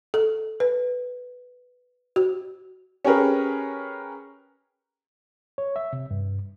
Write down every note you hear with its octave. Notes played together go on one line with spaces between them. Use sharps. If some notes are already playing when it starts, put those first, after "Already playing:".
A4
B4
F#4
C#4 G4 G#4 A#4 B4
C#5
E5
C3
G2